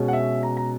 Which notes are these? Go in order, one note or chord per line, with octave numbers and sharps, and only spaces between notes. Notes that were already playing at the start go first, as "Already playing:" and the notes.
Already playing: B2 G#3 C#4
F#5
E5
A#5
A#5